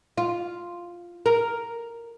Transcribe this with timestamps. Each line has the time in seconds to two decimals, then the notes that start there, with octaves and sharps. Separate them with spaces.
0.17 F4
1.26 A#4